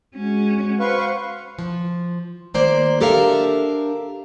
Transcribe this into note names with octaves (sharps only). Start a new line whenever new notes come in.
G#3 C#4 F#4
B4 C5 F5 C#6
F3
D#3 A#3 C5 D5
D4 G4 A4 A#4 E5 F5